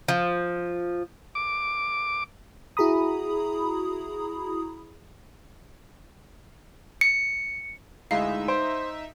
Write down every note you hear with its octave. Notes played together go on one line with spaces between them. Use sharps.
F3
D6
E4 F#4 G#4 A#5 B5 D#6
C#7
D2 G#3 D#4 E4 E5 F5
C5 D7